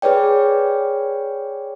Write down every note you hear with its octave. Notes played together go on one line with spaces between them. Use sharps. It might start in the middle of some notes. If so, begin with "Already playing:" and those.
G#4 B4 C#5 D5 G5